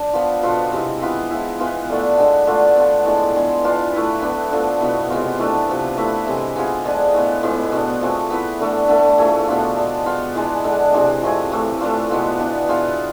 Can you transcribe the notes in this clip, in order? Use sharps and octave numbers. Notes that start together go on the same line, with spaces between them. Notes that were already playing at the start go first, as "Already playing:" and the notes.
Already playing: D4
F3 B3 F4
B2 B3 F4 A4
C3 G#3 C4 E4
E3 B3 F4 B4
F3 G#3 B3 E4
E3 B3 F4
D3 A3 D4 A4
D3 G#3 B3
D3 A3 D4 F4
B3 F4 A4
A2 G#3 D4
D3 G#3 B3
E3 B3 D4 F4
A3 E4 B4
B3 D4 A4
D3 F3 A3
B2 B3 E4
C3 G#3 B3 F4
E3 A3 D4 A4
C3 F3 B3
A3 E4 B4 E5
C3 E3 G#3
G#3 B3 F4 G#4
D3 F3 G#3 D4
A2 G#3 B3
A2 G#3 B3 F4
B2 B3 D4
F3 A3 C4 G#4
B3 E4 B4 E5
D3 A3 D4
D3 A3 E4 A4
F3 A3 E4 G#4
B2 B3 D4 F4
G#3 D4 A4
B3 F4 G#4
E3 G#3 D4
D3 G#3 D4 A4
C3 E3 G#3 D4
F3 A3 C4 G#4
A2 E3 A3
E3 A3 D4 F4
B2 G#3 B3 F4
E3 B3 D4 F4
E3 B3 F4 G#4